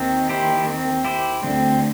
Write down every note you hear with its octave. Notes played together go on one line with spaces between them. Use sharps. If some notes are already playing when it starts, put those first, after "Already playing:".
Already playing: D#2 D#3 C4
E4 G4 C5
C4
E4 G4 C5
D2 D3 C4